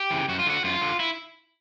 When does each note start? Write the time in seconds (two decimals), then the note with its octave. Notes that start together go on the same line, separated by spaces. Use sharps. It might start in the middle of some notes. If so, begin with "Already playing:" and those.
Already playing: G4
0.10 C#3 E3
0.28 F#2 F#4
0.39 F4
0.46 D3 F#4
0.64 F#2 F4
0.82 D3
1.00 E4